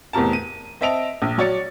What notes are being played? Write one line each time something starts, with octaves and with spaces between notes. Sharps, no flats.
E2 A2 C3 A#4 A5
D#7
C4 D#5 E5 A5 D7 F7
A#1
F#3 C#5 D5 A6 C#7